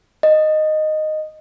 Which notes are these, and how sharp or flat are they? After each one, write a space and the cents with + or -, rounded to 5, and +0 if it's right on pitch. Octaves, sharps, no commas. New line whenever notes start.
D#5 -5